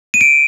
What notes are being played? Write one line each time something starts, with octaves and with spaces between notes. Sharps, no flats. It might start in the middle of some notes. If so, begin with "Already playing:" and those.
D#7
D7